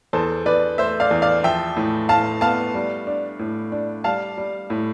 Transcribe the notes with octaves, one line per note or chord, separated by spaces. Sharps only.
E2 A4 C5
E2 B4 D5
A3 C5 E5
D5 F5
E2
D5 F5
F3 E5 G5
A2
A2 F5 A5
B3 F5 A5
G3
D4
A2
D4
G3 F5 A5
G3
A2